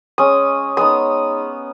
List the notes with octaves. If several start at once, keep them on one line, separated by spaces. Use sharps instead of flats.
G#3 C#4 D#6
G#3 B3 D#4 D#6